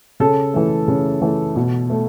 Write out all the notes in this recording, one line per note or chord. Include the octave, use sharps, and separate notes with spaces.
C#3 A4
E3 A3
C#3
E3 A3
B2
A3